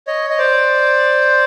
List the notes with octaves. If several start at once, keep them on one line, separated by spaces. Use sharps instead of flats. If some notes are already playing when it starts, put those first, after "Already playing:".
C#5 D#5
D#5
C5 D5